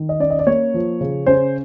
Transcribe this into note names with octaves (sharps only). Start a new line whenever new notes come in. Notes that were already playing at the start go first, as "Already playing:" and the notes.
Already playing: D#3
D#5
C#4 D5
D#5
D5
A#3 C#5
F3
C#3
C#4 C5